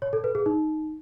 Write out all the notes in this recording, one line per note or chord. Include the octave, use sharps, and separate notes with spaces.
C#5
A4
B4
G#4
D#4